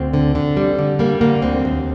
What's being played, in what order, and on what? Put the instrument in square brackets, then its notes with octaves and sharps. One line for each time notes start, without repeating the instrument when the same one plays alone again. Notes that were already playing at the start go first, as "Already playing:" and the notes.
Already playing: [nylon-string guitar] D2 C4
D3
D3
G3
D3
G3 A#3
D3 A#3
D2 C4
D#2